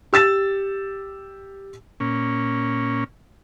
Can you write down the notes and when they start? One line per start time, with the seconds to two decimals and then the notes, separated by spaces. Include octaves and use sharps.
0.13 G4 E6 A6 E7
2.00 A#2 C#4